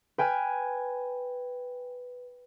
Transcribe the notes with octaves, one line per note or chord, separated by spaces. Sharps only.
B4 G5 G#5 F6